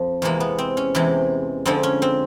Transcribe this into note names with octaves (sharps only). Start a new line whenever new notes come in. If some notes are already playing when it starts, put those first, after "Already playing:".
Already playing: F2 F3
E2 C3 E3 G#3 A#3
B3
C4
C#4
E2 C3 E3 G#3
F2 D3 F3 G#3 C4
C#4
C4